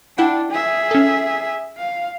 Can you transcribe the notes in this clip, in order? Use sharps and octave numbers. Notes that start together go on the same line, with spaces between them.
D4 E4 F#5 G5
G#4 E5
C#4 A4
F5